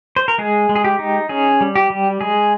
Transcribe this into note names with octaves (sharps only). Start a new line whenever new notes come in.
C5
A#4
G#3 G#4
G#3
G#4
G4
D#4
C#4 G#4
G3
G4
G3
G#3 G#4